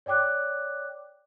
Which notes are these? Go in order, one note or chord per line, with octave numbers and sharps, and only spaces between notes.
C#5 D5 G5 D6 F#6